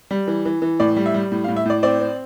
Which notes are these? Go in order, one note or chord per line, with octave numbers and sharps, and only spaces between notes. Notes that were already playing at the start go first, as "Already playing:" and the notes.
G3
E3
E3
E3
A2 D5
G3
E5
G3
A2
F5
A2
E5
A2 D5
C4 D5
C4